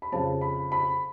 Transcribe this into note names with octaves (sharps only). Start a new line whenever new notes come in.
B5
F2 C#3 F3 A5
B5
B5